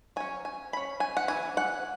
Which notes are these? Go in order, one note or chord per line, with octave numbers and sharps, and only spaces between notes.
F#3 C#4 G#5
G#5
F#3 C#4 B5
G#5
F#5
E3 B3 G#5
F#5